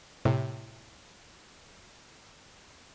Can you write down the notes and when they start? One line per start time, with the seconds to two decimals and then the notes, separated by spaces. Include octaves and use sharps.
0.25 A2 C3